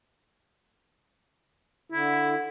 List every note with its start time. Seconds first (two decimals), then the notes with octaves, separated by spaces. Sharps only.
1.92 D3 E4